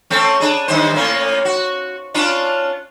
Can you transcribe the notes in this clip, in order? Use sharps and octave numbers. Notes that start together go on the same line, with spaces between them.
A3 C4 C#4
D4 G#4
G2 D#3 C5
A2 A#3 C#4
F#4
C#4 D4 F4